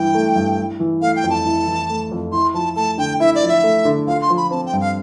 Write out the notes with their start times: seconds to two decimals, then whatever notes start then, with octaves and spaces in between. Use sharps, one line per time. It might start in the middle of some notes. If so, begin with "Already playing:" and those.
Already playing: G2 E3 E4 G5
0.14 A3
0.36 G2
0.58 E4
0.80 E3
1.02 A3 F5
1.16 G5
1.24 F2
1.30 A5
1.46 E4
1.67 E3
1.89 A3
2.11 F2
2.32 E4 C6
2.54 F3 A5
2.76 A3 A5
2.98 D3 G5
3.20 E4 E5
3.35 D5
3.43 F3
3.49 E5
3.63 A3
3.85 D3
4.07 F4 F5
4.22 C6
4.30 F3
4.37 B5
4.51 C4 A5
4.66 G5
4.73 G2
4.81 F5